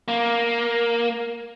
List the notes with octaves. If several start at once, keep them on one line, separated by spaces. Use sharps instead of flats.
A#3